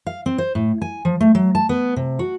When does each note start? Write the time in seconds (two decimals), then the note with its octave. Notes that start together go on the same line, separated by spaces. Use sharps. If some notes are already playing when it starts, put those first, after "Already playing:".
0.07 F5
0.26 C4
0.38 C5
0.55 A2
0.82 G#5
1.05 F3
1.21 A3
1.35 F#3
1.55 A5
1.69 B3
1.96 C3
2.19 F#4